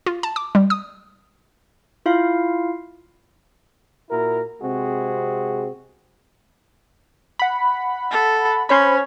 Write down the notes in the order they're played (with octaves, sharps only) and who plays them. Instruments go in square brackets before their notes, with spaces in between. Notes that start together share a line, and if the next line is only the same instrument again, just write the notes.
[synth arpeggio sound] F4
A5
D6
G3
D#6
[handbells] E4 F4 F5
[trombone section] A#2 E4 F#4 A#4
C3 G#3 C4 F#4 G#4
[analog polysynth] F#5 B5
[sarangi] A4
[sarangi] C#4 [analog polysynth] C5 C#5 B5